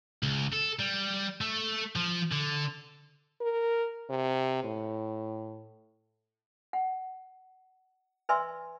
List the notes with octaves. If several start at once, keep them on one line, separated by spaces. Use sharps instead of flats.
C#2
A4
G3
A3
F3
D3
A#4
C3
A2
F#5
B4 D5 E5 G#5 C6 E6